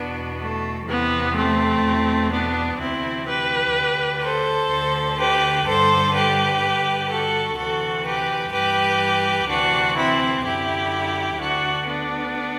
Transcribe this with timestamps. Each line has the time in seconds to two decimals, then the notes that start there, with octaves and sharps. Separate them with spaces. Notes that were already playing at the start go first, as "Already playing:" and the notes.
Already playing: E2 B2 B3 D4
0.40 A3
0.87 E2 C3 E3 B3
1.35 A3 C4
1.84 E2 B2
2.31 B3 D4
2.79 D2 C3 E3 C4 E4
3.26 G4 B4
3.74 D2 D3
4.22 A4 C5
4.69 D2 D3
5.18 G4 B4
5.65 G2 D3 A4 C5
6.13 G4 B4
6.61 G2 D3
7.08 F#4 A4
7.56 D2 C3 E3 F#4 A4
8.04 G4 B4
8.52 G2 E3 G4 B4
9.47 D2 C3 E3 D4 F#4
9.96 C4 E4
10.43 F#2 D3 E4 G4
11.39 D2 D3 D4 F#4
11.87 B3 D4